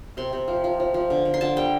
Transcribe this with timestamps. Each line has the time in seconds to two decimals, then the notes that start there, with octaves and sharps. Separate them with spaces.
0.17 C3 C6
0.33 C3
0.48 F3
0.64 F3
0.80 F3
0.94 F3
1.10 D3
1.25 D3
1.34 C6
1.41 D3 A5
1.56 G3 G5